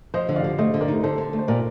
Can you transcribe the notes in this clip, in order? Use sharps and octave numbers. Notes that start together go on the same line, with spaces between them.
F3 C5 D#5
D3
D5 F5
D3
A3 C5 D#5
D3
A#4 D5
D#4
D3 A4 C5
D3
A3
C5
A#2 A#4 D5